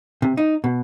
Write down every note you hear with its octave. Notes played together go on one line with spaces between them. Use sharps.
C3
D#4
B2